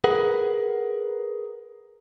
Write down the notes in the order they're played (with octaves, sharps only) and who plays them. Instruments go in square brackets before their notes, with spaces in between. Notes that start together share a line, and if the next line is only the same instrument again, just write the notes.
[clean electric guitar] G#4 A#4 B4 F#5